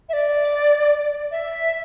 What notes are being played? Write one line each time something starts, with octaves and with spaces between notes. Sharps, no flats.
E5
D5
E5